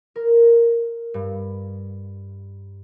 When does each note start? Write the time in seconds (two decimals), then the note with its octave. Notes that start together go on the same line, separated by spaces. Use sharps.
0.16 A#4
1.14 G2